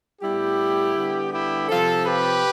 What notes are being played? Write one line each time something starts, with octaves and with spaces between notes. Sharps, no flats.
A2 G3 B3 E4 G4
D3 G3 B3
E4 G4
C3 F3 C4 F4 A4
G4 B4